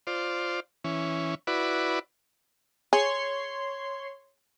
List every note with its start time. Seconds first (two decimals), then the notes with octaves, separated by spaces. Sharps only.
0.07 F4 C5 D5
0.84 E3 C#4
1.47 E4 F#4 B4 D5
2.93 G#4 C#5 C6